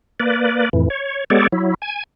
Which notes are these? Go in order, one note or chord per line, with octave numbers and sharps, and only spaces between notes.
A#3 B4 D5
F2 A2 E3
C#5
G#3 B3 G4 A4 C#5 D5
F#3 E4
G#5